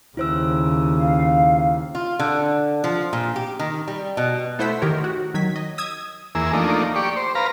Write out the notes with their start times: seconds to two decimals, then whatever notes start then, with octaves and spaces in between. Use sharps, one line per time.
0.17 D#2 C#3 E4 C5 E6
0.98 F5
1.95 F4
2.19 D3
2.84 F3
3.13 A#2
3.36 G4
3.59 D#3
3.88 G3
4.17 B2
4.59 A3 E4 C5 F#5 E6 B6
4.82 D#3 G4 A#4 C#5
5.04 F#4
5.34 D#3 F#3 G#6 B6
5.56 D#5
5.78 D#6 E6 G#6
6.35 E2 A#3 G#4 E6
6.53 F3 A3 A#3 D4 D#4
6.96 G4 D5 C#6
7.16 C5
7.35 B4 F5 A#5